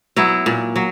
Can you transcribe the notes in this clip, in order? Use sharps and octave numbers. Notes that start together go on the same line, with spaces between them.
F#3 B3 E4
A#2
F#3